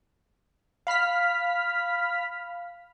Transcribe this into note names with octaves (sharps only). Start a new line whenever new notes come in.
F5 B5 F6 B6